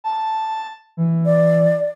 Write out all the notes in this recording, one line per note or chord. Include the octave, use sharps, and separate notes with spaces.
A5
E3
D5